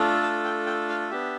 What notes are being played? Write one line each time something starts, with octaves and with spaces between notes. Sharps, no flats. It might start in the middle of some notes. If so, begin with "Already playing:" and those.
Already playing: A3 D4 F4 A4
A5
G5
G5
F5
B3 D4 G4 E5